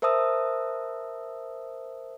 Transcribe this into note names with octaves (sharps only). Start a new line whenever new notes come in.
A#4 C5 E5 A5 D#6 E6